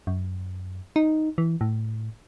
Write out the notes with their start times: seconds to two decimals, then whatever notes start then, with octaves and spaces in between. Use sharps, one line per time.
0.07 F#2
0.96 D#4
1.38 E3
1.61 A2